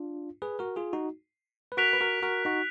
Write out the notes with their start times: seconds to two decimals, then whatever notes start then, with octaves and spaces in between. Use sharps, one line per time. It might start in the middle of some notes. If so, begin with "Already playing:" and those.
Already playing: D4 F4
0.42 G#4 B4
0.59 F#4 A#4
0.76 F4 G#4
0.93 D#4 F#4
1.72 B4
1.77 F#4 A#4 F#6 B6 D7 F7
1.93 B4
2.01 F#4 A#4
2.23 F#4 A#4
2.45 D#4 F#4